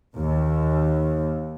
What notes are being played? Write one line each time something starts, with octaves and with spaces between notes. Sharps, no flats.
D#2